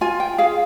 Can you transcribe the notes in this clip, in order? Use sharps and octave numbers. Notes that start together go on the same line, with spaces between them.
F4 G#5
G5
G#4 F5